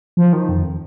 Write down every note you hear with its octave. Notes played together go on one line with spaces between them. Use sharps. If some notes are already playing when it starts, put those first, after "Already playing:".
F3
D#3
F2